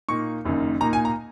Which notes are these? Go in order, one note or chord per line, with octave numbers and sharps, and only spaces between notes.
A#2 A#3 D#4 C#6
F#1 F#2 D#3 A#3 D#4
A#2 A#3 D#4 A#5
G#5
A#5